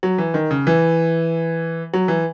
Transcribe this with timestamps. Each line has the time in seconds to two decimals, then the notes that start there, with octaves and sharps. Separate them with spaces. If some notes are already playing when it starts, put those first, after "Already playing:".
0.03 F#3
0.18 E3
0.34 D#3
0.51 C#3
0.67 E3
1.94 F#3
2.08 E3